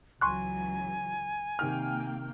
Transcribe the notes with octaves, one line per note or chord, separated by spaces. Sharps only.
C#2 E3 F#3 G#5 C6 C#6 F#6
C3 D#3 A#3 G5 F6